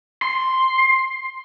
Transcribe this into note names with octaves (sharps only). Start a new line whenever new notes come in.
C6